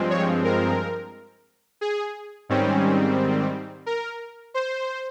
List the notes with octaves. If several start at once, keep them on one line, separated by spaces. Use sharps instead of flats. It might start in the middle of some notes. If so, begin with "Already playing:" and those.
Already playing: G2 F3 G#3 C4
C#5
A#4
G#4
G#2 D#3 G3 C4 C#4
A#4
C5